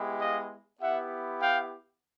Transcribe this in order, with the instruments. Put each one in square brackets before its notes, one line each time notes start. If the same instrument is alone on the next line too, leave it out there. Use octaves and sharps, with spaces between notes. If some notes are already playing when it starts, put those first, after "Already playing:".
Already playing: [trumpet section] G#3 B3 E4 G4
D#5 F5
B3 E4 G4 E5 F#5
F5 G5